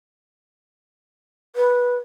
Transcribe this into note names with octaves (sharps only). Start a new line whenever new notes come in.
B4